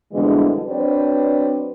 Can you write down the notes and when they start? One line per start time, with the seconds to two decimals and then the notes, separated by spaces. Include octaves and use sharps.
0.13 F2 B2 D3 E3 G3 G#3
0.66 F#3 C4 D4 B4 C5 D5